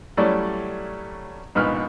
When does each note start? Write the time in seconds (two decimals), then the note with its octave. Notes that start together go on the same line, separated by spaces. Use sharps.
0.17 F#3 G3 A3 C#4 E4 D5
1.55 A#1 G#2 B2 B4 F6